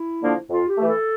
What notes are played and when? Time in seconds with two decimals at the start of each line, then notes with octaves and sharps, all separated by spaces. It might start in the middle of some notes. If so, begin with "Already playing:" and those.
Already playing: E4
0.22 D3 F3 A#3 D4
0.50 F2 F4
0.68 G4
0.78 E3 A3
0.88 A4